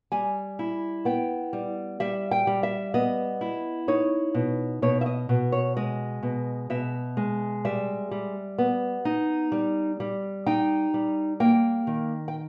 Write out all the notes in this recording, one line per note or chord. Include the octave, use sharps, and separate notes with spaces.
G3 G#5
E4
B3 G5
G3
G3 E5
G5
G3
E5
B3 D#5
E4
D#4 C#5
B2
B2 C#5
E5
D#5
B2
C#5
G#3 D#5
B2
B2 E5
G#3
G3 E5
G3
B3
D#4
G3
G3
D#4 G5
G3
A#3 G5
D#3
G5